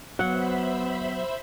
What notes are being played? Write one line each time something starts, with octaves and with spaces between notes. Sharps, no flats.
F#3 B3 C5 E5 F#5 B5